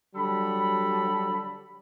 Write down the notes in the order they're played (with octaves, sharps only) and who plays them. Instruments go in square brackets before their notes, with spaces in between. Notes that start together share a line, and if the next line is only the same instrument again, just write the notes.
[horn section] D3 F#3 G3 A4 A5 B5